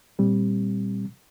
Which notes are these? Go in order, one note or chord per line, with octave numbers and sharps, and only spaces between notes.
A#2 G3 C4